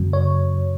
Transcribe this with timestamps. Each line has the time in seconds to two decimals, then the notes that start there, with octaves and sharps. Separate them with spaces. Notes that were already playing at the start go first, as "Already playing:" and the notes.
Already playing: F#2 C#3 F#3
0.13 C#5